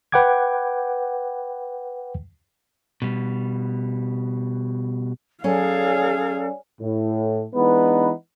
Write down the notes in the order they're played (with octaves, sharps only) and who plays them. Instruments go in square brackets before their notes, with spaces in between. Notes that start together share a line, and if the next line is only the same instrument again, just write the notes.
[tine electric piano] B4 F#5 G5 D6 G#6
[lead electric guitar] B2 G3
[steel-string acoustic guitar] F#3 C#4 [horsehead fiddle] G#4 F5 [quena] A4 [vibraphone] C#5 D5 G#5
[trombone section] A2
E3 G#3 B3 D4 D#4 B4